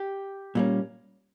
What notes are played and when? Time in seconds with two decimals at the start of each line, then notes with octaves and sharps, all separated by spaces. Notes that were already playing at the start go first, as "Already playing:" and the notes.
Already playing: G4
0.55 A#2 G3 A#3 C#4